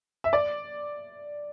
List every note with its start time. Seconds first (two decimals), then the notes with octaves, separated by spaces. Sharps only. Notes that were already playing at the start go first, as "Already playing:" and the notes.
0.24 E5
0.33 D5